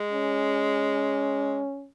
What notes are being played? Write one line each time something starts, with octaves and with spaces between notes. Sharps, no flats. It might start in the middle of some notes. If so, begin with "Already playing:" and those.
Already playing: G#3
C#4